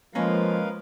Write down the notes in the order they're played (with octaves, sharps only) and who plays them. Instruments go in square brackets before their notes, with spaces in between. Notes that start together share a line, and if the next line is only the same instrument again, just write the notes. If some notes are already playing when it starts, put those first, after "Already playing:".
[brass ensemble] F3 [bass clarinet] G#3 [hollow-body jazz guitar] A#3 C#4 [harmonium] A#4 B4 F5